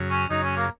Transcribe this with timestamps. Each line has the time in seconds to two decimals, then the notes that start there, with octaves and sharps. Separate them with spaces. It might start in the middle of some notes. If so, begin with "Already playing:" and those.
Already playing: F#2 C#3 F#3
0.10 C#4
0.30 F#2 C#3 F#3 D#4
0.43 C#4
0.57 A#3